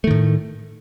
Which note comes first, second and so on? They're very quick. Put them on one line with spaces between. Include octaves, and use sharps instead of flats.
A3 D#3 A2